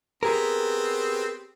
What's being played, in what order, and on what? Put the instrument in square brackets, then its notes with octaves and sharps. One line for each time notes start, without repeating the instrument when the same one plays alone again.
[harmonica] B3 C4 [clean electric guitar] G4 G#4 A#4